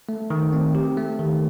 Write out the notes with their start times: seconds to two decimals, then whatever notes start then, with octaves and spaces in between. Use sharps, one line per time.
0.09 A3
0.30 D#3
0.53 C4
0.75 G4
0.97 A3
1.19 D#3